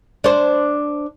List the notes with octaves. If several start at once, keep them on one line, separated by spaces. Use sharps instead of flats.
D4 C5